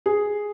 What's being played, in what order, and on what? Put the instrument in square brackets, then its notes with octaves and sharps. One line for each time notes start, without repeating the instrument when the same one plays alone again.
[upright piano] G#4